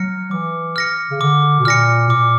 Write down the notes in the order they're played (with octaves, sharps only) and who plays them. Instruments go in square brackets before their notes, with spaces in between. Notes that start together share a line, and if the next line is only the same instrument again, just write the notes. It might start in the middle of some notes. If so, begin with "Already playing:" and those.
Already playing: [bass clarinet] F#3 [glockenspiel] F6 A#6 C#7
[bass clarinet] E3 [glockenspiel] D6
[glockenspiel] F6 A#6 C#7
[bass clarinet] C#3
[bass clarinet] D3 [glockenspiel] D6
[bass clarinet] B2
[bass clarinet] A#2 [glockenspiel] F6 A#6 C#7
[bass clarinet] A#2 [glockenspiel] D6